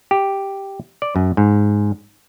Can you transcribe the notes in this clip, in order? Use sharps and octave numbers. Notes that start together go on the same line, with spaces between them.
G4
D5
F#2
G#2